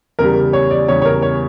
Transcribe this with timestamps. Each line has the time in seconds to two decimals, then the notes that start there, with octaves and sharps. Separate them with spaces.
0.19 E2 C#3 G3 A#4
0.53 C#5
0.71 D5
0.88 E2 C#3 G3 C#5
1.02 C#5
1.05 A#4
1.22 C#5